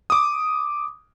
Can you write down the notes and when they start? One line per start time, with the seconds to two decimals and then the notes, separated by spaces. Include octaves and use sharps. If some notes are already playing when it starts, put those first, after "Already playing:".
0.10 D6 D#6